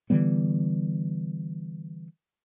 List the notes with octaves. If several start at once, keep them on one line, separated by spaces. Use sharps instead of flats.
D3 E3 G3 B3